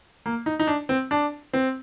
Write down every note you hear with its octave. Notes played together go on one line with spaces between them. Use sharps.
A#3
D#4
D#4
D4
C4
D4
C4